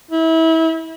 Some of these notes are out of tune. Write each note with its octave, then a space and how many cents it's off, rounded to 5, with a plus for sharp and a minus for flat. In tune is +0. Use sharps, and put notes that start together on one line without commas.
E4 -30